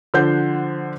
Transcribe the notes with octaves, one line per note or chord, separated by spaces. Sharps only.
D3 F3 C5 F#5 G6